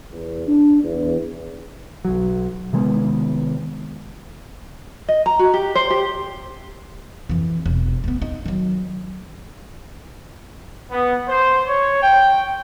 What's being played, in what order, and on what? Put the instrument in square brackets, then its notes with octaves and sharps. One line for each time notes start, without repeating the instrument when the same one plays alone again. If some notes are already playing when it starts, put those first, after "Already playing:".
[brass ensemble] E2
D4
E2
[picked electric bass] B1 F#3
C3 D#3 G#3 B3
[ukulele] D#5
A#5
F#4
G4
C5
G4
[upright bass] F2 E3
E1
A3 B3
D#4
D#3 F#3
[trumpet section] B3
C5
C#5
G5